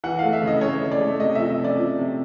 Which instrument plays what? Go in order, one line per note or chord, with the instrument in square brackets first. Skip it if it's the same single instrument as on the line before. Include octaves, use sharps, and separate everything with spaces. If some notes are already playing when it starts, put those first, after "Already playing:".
[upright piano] E3 F#5
A3 F5
E5
C#3 D#5
A3 C#5
C#3
D5
A3
C3 D#5
F3 E5
E5
C#4
D5
F3
C3